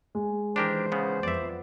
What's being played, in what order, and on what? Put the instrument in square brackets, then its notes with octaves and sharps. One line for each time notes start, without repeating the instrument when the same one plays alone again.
[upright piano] G#3
[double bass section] D#3 E3 [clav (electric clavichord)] D4 G4 A#4 [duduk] C5
[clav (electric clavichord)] C#3 B3
[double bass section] F2 F3 B3 [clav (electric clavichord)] D5 E5